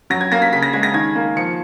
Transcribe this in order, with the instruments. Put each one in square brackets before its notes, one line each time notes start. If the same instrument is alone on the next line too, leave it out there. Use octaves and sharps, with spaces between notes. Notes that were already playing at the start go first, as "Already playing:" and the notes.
[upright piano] F#3 A#6
G#6
A#3 A#6
B6
C#3 B6
A#6
G#3 G#6
A#6
D#3 G#6
A#3
F3 C#7